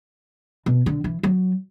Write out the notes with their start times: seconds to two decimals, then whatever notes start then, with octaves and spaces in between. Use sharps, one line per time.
0.66 B2
0.86 D3
1.04 E3
1.23 F#3